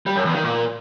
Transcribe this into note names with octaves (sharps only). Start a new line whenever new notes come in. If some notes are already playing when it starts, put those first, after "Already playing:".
G3
F#2
E2
D#3
A#2